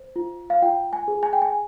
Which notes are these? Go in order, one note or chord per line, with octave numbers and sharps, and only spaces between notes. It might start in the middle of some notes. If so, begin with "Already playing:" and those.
Already playing: C5
F4
F5
F4 G5
G#5
G#4
G#5
G5
G#5